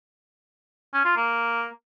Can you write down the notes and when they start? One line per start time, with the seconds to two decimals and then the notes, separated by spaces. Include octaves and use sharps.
0.94 C#4
1.05 F4
1.17 A#3